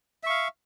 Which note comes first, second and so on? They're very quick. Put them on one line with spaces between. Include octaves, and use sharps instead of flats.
E5 C#6 F5